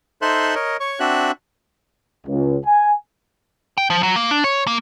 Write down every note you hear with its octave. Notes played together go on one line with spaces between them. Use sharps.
D#4 A4 C5 E5 C6 F#6
A#4 C#5 D#5
C#5 C#6
C4 D4 F#4 E5 F#6
C#2
G#5
G5
F3
F#3
A#3
D4
C#5
A#3